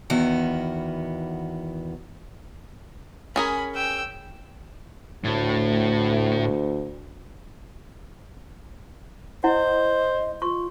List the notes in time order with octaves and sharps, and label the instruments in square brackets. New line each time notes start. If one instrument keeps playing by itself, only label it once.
[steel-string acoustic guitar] E2 D#3 B3 F#4
[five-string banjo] C#4 G#4 A#4 [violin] B5
[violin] G5 E6
[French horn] D2 [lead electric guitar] A2
[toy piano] E4 F#5 [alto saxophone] C5 [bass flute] D#5
[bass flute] F4 [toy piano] C6 C#6